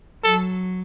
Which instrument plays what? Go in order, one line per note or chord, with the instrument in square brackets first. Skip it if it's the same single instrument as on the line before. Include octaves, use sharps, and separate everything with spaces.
[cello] F#3 [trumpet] A4